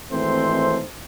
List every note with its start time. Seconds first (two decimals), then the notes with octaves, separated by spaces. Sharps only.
0.11 G#1 E3 A3 C4 C5